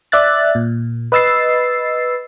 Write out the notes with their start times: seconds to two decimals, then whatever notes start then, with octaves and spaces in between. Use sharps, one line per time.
0.12 D5 E5 F#6 A6
0.55 A#2
1.12 B4 D#5 E6 A6 C7